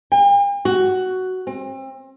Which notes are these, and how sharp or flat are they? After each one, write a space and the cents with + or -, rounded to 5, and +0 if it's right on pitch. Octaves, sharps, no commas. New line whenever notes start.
G5 +45
F#4 +10
C4 +35